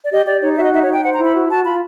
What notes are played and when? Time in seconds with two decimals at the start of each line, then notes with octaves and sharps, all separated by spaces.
0.06 D5
0.12 G4 D#5
0.27 G4 D5
0.42 D#4 C#5
0.52 D5
0.57 F#4 E5
0.62 D#5
0.73 D#4 E5
0.83 C#5
0.88 D#4
0.93 G5
1.03 C5 F#5
1.14 A#5
1.19 E4
1.24 B5
1.34 F#4
1.49 F#4 A5
1.65 F4 B5